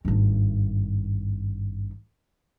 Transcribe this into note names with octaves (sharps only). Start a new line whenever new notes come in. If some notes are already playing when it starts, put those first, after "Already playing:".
G#1 G2